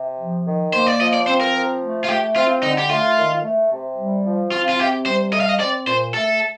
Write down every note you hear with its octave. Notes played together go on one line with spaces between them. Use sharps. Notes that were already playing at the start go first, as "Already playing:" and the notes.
Already playing: C3
F3
D#3
A#3 C5
D5
F3 D#5
D5
C4 C5
A#4
F3
A3
F4
A3 G4
C4 F4
D3 D#4
G4
A3 F4
D#3
A3
C3
G3
F3
C4 F4
F4
C3 G4
G3 C5
A3 D#5
F5
D#5
C4 D5
A#2 C5
A3 A4